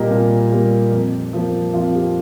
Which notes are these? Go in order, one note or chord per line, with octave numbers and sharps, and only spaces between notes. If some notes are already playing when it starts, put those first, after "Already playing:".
Already playing: A#2 G3 A#3 G4 A#4 D#5
A#2
G3 A#3
F2
F3 A#3
F2 F4
G4